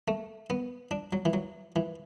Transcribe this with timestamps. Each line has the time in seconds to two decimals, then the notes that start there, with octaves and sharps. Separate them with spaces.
0.08 A3
0.50 B3
0.91 D4
1.13 F#3
1.25 E3
1.33 F#3
1.76 E3